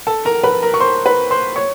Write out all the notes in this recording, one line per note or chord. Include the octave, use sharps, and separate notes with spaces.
A4 A5
A#4 A#5
B4 B5
A#4 A#5
C#6
C5 C6
B4 B5
C5 C6
C#5 C#6